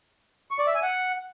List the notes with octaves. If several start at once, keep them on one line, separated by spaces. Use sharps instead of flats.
C#6
D5
E5
G#5
F#5